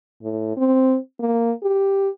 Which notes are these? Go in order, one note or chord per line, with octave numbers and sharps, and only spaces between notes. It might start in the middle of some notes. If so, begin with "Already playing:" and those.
A2
C4
A#3
G4